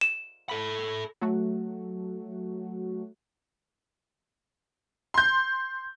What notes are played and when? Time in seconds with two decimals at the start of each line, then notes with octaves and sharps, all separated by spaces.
0.01 E7
0.49 A4 B5
1.21 F#3 A3 F#4
5.14 C6 G6